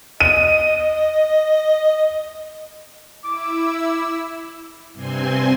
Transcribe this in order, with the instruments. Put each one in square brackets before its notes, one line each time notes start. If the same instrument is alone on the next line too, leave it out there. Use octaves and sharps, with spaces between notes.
[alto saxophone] D#5 [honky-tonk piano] D#7
[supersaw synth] E4 E6 [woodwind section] D6
[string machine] G2 C3 C4 G#5 C6